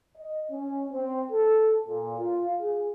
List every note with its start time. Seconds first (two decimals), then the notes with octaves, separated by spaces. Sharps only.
0.18 D#5
0.52 C#4
0.92 C4
1.32 A4
1.88 A#2
2.18 F4
2.61 G#4